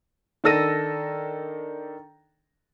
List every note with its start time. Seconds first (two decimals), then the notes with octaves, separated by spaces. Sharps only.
0.44 D#3 D4 A4 E6 A#6 D#7